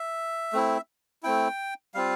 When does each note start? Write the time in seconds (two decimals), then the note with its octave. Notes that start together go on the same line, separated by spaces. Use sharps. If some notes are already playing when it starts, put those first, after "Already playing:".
Already playing: E5
0.53 A3 C4 E4
1.23 A3 C4 E4 G5
1.94 G3 C4 F4 F5